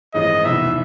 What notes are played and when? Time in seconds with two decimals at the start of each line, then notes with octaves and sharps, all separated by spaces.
0.14 A1 G2 D#3 G#3 C4 D#5
0.44 F1 E2 B2 E5